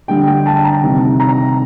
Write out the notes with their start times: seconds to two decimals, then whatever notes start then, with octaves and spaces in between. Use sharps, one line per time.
0.08 D3 G3 G5
0.27 G5
0.46 A5
0.64 A#5
0.83 C3 D#3 G3
1.20 A#5